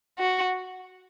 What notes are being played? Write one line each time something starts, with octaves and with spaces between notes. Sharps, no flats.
F#4